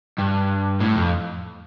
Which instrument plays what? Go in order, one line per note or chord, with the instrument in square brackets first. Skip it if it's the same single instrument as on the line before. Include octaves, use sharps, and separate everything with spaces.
[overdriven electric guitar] G2
A2
F2